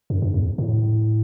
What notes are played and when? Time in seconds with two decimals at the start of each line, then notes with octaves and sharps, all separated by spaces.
0.10 F#2
0.22 G2
0.34 E2
0.58 A2